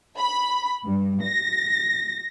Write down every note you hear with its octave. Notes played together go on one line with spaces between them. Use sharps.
B5
G2
A#6